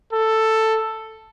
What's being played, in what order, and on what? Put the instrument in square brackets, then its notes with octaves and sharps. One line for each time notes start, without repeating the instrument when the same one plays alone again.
[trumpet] A4